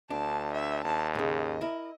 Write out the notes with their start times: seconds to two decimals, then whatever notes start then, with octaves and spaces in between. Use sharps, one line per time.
0.10 D2 D4 A5
0.54 E5
0.85 D#2 A5
1.15 G#2 C#3 D#5
1.61 E4 A#4